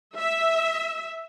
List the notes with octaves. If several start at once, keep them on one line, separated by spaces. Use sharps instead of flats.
E5